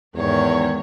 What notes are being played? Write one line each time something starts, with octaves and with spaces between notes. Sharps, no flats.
E2 G#2 D#3 C#5